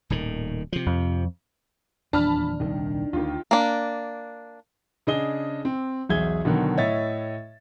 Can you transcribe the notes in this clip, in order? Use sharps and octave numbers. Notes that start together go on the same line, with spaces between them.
D#1 A2 D#3
C3 F3
F2
D#1 E2 F3 D4 A5 B5 F6
D#1 C2 D#3
D2 D#3 F4
A#3 D4
C#3 D4 G#4 D#5 D#6 G7
C4
B1 E2 G#4 E5 G#6 G7
B2 D3 D#3 F#3
A2 C#5 D#5 E5 A6